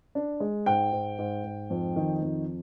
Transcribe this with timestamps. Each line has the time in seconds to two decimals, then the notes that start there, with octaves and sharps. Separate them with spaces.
0.15 D4
0.40 G#3
0.66 G#2 G5
0.92 G#2
1.19 G#2
1.44 G#2
1.70 F2
1.96 D#3
2.22 F2